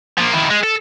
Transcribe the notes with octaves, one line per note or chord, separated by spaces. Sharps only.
F3 A#3
D#3 E4
G#3
A4